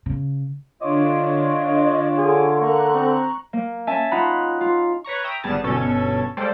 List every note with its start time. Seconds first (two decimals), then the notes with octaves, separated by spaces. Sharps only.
0.06 C#3
0.82 D3 D4 F4 C#5 D#5 D6
2.18 D3 G#4
2.61 A#3 A#5 C#6 F#6
2.95 C4
3.53 A#3
3.87 C#4 E5 G#5 A5
4.11 D#4 F4 F#5 A#5 B5
4.61 F4
5.04 B4 C#5 A#5 C#6
5.24 E5 G5 A#5 D#6
5.43 G#1 G3 B3 G#4 A5 A6
5.64 G1 B2 C#4 A4 G#6
6.37 G3 G#3 A#3 A4 C5 D5